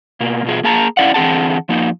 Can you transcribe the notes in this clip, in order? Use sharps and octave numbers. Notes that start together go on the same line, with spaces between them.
B2 A#3
B2 F4 G#4
A#3 G#4 A5 A#5
C#4 E4 D5 F5 F#5
D3 E3 C4 G#4 F#5 A5
F3 A#3 D#4